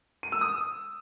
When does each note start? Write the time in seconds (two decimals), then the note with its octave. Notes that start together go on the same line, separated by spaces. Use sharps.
0.23 D#7
0.32 E6
0.41 D#6